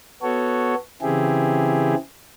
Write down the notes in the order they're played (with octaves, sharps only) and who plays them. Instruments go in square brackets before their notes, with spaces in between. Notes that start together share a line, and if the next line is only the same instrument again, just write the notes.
[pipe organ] B3 F#4 A4 C#5
C#3 E3 C4 E4 G4 G#4